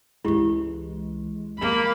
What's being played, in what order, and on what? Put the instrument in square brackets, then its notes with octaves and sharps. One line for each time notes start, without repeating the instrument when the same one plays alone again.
[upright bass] C#2 E3 [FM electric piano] G#3 [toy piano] E4 G4
[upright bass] G2 F3 [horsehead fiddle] A#3 B5